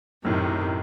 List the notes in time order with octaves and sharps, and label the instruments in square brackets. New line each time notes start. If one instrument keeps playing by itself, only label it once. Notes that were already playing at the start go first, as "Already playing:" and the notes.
[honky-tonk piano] B1 A2 [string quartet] F#2 C3 D#3